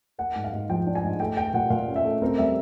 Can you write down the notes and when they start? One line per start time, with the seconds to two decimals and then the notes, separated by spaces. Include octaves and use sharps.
0.18 A#3 F#5
0.35 G#2
0.44 F5
0.53 G#2
0.69 F3 G5
0.87 D4
0.95 G#5
1.04 G#2
1.20 A3 G5
1.37 A3 G5
1.54 A#2 F#5
1.70 A#2 F5
1.88 C#4
1.96 E5
2.05 A3
2.22 C4 A#4
2.38 G3 E5